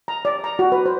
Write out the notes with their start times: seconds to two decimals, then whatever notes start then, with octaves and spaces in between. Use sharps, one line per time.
0.08 A#5
0.25 D5
0.44 A#5
0.59 F#4
0.72 B4
0.86 C5